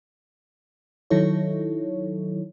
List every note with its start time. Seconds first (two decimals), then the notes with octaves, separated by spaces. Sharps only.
1.10 D#3 F#3 D#4 E4 A4 C#5